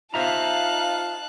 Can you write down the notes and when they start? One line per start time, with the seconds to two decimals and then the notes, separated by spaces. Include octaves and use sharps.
0.14 D#4 F4 C5 E5 F5 A5 A#5 F#6